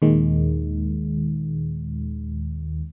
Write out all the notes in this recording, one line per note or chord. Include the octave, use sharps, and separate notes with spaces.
D#2 A#2 D#3 G#3